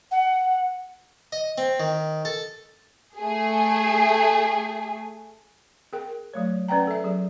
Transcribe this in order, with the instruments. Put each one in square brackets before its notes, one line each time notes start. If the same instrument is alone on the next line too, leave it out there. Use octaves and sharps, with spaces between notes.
[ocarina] F#5
[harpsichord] D#5
C4
D#3
A4
[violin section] A3 G#4
[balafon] G#4 A#4 G5
F#3 A3 C#5
C#4 B4 D5 F#5 G5 A#5
A4 E5
F#3 G#4